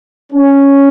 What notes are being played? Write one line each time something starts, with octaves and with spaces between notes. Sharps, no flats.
C#4